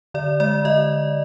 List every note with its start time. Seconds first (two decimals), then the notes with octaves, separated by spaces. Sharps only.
0.14 D3 D5
0.40 G#3 D5
0.65 D3 D#5